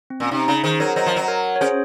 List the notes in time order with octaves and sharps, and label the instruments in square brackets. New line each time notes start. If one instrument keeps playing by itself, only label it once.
[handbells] C4
[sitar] A#2 [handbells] C#4
[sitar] C3 [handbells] D#4
[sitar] C#3 [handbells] D#4
[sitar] D#3 [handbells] G#4 C5
[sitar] F#3 [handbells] A#4 C#5
[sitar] F#3 [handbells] C5 D#5
[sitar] F3
F#3
[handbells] A#4 C#5
C#5
[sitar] C#4 [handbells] G#4 C5